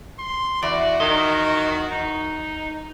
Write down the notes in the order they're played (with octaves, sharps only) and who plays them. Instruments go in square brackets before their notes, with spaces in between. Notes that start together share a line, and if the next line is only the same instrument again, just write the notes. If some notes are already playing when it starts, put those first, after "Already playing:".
[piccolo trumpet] C6
[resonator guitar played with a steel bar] E2 [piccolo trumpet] F#4 [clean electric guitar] D5
[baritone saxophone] D#3 [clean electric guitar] D#5
[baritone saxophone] D#4